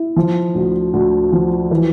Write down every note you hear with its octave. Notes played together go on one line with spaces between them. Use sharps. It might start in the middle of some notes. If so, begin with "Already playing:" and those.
Already playing: E4
F3
D2
D2
F3
E3